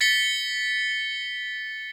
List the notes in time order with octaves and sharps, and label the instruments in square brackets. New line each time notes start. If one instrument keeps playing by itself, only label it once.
[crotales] A6 B6 C#7 G7